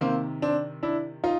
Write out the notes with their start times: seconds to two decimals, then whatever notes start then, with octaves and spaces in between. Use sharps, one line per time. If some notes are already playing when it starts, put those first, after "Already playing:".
0.01 C3 D#3 A#3 C4
0.42 C4 D4
0.83 D4 E4
1.24 D#4 F4